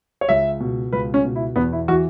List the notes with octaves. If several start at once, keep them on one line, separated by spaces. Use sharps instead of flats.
C#5
C#2 E5
B2
C#2 B4
C#4
B2
E4
E2 B3
E4
E3 F#4